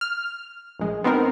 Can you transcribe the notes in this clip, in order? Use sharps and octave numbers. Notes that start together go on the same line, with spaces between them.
F6
A#1 G#3
B3 C4 D#4 A#4